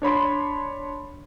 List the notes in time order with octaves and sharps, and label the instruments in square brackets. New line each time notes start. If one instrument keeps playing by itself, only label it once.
[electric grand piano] D4 C#5 B5 C6